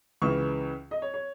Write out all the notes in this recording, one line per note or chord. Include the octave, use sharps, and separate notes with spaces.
C#2 C#3 E3 C#6
D#5
C#5
C#5